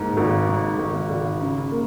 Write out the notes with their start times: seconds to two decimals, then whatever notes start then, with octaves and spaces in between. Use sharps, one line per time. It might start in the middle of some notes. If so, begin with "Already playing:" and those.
Already playing: G#2 A#3
0.17 G#1
0.48 G#2
0.79 G#1
1.09 G#1
1.41 C#3
1.71 A#3